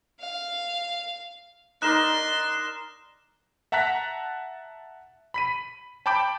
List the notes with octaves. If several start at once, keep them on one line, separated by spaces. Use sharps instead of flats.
F5
D#4 A#4 D5 C6 F#6 E7
E5 F#5 A5 A#5 F#6 B6
B5 B6 D#7
G5 A5 B5 D6 G6 D7